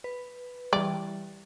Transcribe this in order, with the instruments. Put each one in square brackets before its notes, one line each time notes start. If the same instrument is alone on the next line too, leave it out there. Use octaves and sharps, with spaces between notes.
[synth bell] B4
[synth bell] E3 G3 [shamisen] D5